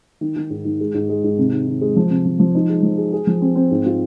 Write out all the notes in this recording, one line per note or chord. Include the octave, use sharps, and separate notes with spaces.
D#3
D#3
G#2
D#3
G#3
G#2
G#3
G#2
C3
D#3
D#3
G#3
F3
C3
F3
F3
D#4
G#3
F3
G#4
G#4
F3
C4
C4
G#2
F4